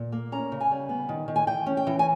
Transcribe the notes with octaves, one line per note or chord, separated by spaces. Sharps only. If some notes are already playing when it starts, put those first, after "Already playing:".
Already playing: A#2
A#3
C#4 A#5
C#3
G#5
G3
B3
D#3
D#3
G#5
E3 G5
C#4
G5
E3
G#5